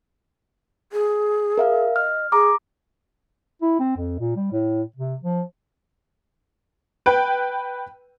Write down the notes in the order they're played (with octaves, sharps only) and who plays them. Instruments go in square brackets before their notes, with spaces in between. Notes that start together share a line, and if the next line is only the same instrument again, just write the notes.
[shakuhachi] G#4
[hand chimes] A#4 E5 F5
[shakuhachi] D#5 [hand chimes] F6
[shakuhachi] G#4 [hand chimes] A#5 D6
[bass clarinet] E4
C4
F2
A#2
G3
A2
C3
F3
[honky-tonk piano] B4 G5